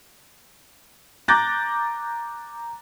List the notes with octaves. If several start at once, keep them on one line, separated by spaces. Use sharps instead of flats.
A#5 D6 F#6 G6 A6 A#6